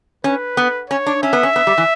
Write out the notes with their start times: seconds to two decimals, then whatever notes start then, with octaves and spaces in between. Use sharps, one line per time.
0.24 C#4 B4
0.57 B3
0.90 C#4 C#5
1.06 D4
1.23 C#4 E5
1.33 B3
1.43 C#4
1.56 B3
1.67 G3
1.78 E3